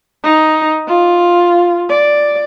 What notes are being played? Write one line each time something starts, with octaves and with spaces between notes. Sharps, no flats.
D#4
F4
D5